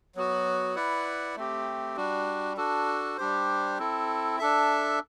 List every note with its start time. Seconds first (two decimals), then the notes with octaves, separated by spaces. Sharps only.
0.15 F#3 B3 F#4
0.75 E4 B4 D5 F#5
1.36 A3 C4 G4
1.96 G3 D4 F#4
2.57 D4 F#4 A4
3.18 G3 D4 G4 C5
3.78 C4 E4 A4
4.39 D4 A4 E5